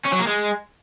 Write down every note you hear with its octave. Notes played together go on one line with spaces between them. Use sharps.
C#4
F#3
A#3
G#3